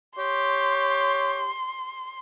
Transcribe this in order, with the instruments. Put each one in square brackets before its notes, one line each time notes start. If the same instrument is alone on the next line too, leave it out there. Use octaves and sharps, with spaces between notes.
[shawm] G4 [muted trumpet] C#5 [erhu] C6